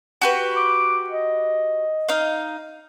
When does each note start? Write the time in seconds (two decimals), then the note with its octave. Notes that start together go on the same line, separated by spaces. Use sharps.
0.22 F#4 G4 B4
0.56 D6
1.09 D#5
2.09 D#4 F5